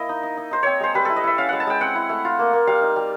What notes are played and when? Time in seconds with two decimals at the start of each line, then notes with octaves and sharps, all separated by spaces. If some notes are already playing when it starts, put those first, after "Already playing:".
Already playing: A#3 E4 D#5
0.09 D#4
0.23 D#4
0.37 D#4
0.51 D#4 C5
0.63 C4 C#5
0.80 G#3 C5
0.94 G3 B4
1.05 E4 A4
1.16 D#5
1.23 E4 E5
1.38 C#4 F5
1.49 G#3 F#5
1.60 A5
1.67 G#3 G5
1.81 C4 F#5
1.95 E4
2.09 A3
2.25 F4
2.39 A#3
2.53 A#3
2.67 G3 F5
2.82 D#4
2.96 G3